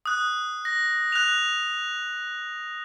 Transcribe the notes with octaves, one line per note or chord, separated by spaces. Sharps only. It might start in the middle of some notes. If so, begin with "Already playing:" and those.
D#6 F#6
A#6
F#6 F7